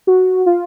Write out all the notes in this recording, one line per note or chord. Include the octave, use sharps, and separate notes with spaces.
F#4
F4